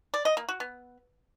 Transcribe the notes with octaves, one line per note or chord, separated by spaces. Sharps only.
D5
D#5
A#3
F#4
B3